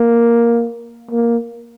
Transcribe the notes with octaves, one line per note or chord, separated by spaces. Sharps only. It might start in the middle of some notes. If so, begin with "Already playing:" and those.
Already playing: A#3
A#3